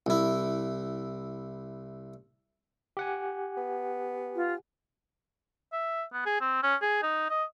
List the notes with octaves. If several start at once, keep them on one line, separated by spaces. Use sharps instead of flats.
C2 E4
G4 F#5 G#5
B3
F4
E5
B3
G#4
C4
C#4
G#4
D#4
D#5